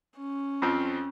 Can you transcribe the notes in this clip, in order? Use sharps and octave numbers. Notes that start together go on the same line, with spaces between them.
C#4
F2 F3 C4